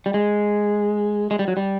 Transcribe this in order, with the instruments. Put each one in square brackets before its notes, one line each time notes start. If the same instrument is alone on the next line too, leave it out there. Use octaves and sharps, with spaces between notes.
[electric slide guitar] G3
G#3
G#3
G3
F#3
G3